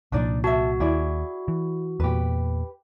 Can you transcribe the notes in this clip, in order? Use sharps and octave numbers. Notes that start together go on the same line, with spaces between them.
C2 A#2 F3 D4 D#4 D5
F#4 E5 A5
D#2 E4 G#4 D5
E3
E2 A#2 G4 B4